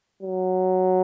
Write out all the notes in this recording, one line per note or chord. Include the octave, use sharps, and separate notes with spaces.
F#3